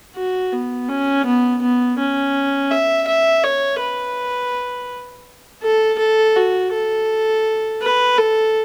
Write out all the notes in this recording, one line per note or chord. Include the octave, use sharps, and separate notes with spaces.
F#4
B3
C#4
B3
B3
C#4
E5
E5
C#5
B4
A4
A4
F#4
A4
B4
A4